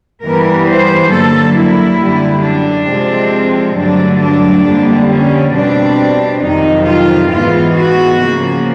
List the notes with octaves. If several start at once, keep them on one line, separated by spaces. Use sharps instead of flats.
G2 E3 G3 B3 A#4
C5
G2 D3 F#3 A#3 A4
E4
F#2 D3 G3
D4
C3 F3 G#3 C4
G2 D3 F#3 A3 D4
D4
F2 D3 G3 A#3
C#4
B2 G3 C4 D4
F2 C3 D#3 F#3 D#4
F4
G#2 E3 G#3 B3 F4
F#4
C#3 F3 A#3